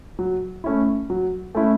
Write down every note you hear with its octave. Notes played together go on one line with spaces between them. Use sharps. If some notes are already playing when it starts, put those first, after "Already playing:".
F#3
A3 C#4 E4
F#3
A3 C#4 E4